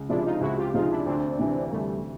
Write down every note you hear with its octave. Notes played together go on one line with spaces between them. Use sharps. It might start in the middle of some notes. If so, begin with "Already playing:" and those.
Already playing: C#2
C3 F3 G#3 D4 E4
D#4 F4
C#2 E4 F#4
F4 G4
C3 F3 G#3 D#4 F4
D4 E4
D2 C4 D4
C3 E3
A#3
D2 G3 A3